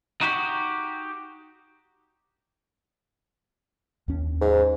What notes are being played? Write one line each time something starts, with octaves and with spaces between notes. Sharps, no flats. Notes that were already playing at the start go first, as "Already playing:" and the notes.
D#4 F#4 G4
D#2 C#4
G#2